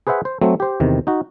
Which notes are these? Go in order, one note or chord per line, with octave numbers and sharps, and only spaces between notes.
G#4 B4 C5 E5 F#5
C5
F#3 A3 C4
G4 C5
E2 C3 D#3
D#4 F#4